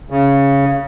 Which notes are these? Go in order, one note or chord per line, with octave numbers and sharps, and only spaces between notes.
C#3